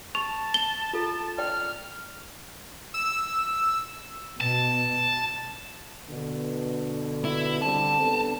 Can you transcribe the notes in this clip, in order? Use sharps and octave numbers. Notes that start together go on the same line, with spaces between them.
A5 C#6 F7
G7
F4 A4
D5 G5 F6
E6
B2 A5
B2 D3
E4
D3 G3 C4 A5
B3 D4 A4